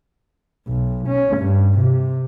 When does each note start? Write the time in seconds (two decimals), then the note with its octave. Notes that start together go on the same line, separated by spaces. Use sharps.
0.68 B1
1.08 C#4
1.38 G2
1.80 C3